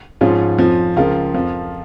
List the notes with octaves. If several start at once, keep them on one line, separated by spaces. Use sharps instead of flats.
G#2 F3 C#4 F4
F2 F3
C#2 C#3 F3 F4 A#4
F2 F3